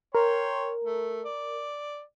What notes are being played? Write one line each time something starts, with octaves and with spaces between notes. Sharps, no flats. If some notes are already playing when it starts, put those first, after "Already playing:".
A#4 C#5 G5 C6
A3
D5